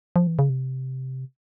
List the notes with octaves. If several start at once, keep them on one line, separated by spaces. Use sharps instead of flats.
F3
E3
C#3
C3